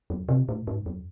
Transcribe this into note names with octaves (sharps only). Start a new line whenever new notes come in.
F#2
C3
A2
G#2
F#2